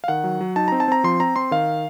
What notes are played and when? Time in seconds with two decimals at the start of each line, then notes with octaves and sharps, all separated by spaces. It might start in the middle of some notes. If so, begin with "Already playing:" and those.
0.04 F5
0.08 D#3 F#5
0.24 F#3
0.41 F#3
0.56 D#4 A5
0.68 C4 A#5
0.80 A5
0.88 C4 A#5
1.04 F3 C6
1.20 C4 A#5
1.36 C4 C6
1.51 D#3 F5